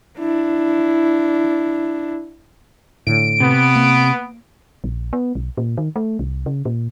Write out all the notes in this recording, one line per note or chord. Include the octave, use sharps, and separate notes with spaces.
D4 E4
A2 D3 D7
C3 B3
A#3
A#1
B3
B1
A#2
D#3
A3
C2
C#3
A#2